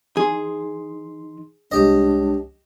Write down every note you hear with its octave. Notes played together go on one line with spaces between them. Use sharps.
E3 D#4 G#4 C6
C2 G#3 D4 G4 C#5 D#5